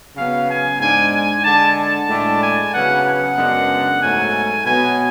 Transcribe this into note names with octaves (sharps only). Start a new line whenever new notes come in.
C#3 F#3 B3 F5
G#5
G#2 G#3 D4 G#5
G#5
D3 G#3 D4 A5
A5
A2 G#3 D4
G#5
C#3 F#3 B3 F#5
F#5
F#2 C#3 G#3 B3 D4
G#2 F#3 A3 G#5
B2 F#3 B3 G#5